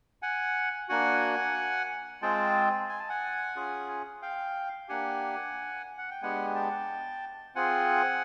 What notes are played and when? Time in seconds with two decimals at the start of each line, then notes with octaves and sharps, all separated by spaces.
0.22 F#5 G#5
0.89 A#3 D4 F#4 F#5 G#5
2.22 G#3 C4 F4 G#4 G5 A5
2.89 G#5
2.99 A5
3.09 F#5 G#5
3.56 C#4 F4 G#4
4.22 F5 G5
4.89 A#3 D4 G4 F#5 G#5
5.98 F#5
6.10 G5
6.22 G#3 B3 D4 G4 F#5 G#5
6.55 G5 A5
7.55 C4 F4 G#4 F#5 G#5